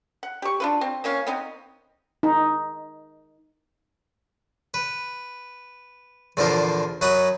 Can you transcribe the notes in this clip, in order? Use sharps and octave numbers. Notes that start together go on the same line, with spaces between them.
F#5
G4 C#6
D4 F4 B4
C4
E3 A#3 C#4 F5
B3 C4 D#4
D#4
B4
E2 A#2 D3 F3 A#4 C5
F#2 F#3 F#4 B4 D#6